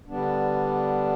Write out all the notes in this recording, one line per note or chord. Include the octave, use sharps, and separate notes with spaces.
D3 G3 B3 D4